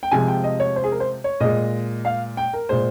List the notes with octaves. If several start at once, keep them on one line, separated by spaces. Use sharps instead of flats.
G5
C3 F3 G#3 G#5
G5
D#5
C#5
C5
G#4
A#4
C5
C#5
A#2 G#3 D#5
F5
G5
A#4
A#2 G#3 C5